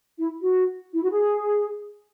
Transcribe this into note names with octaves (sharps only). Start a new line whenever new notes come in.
E4
F#4
E4
F#4
G#4